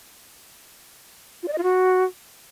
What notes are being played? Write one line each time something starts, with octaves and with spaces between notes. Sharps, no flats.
F4
D5
D#5
F4
F#4